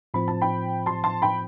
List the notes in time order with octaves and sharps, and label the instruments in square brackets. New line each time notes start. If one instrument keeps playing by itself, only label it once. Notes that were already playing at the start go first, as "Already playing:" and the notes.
[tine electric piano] A2 F3 C4 F4 C5 [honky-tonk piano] B5
[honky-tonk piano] A5
G5 B5
A5 C6
A5 C6
G5 B5